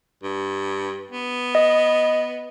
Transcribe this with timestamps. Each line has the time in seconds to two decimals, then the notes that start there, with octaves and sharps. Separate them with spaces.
0.23 G2
1.11 B3
1.55 D#5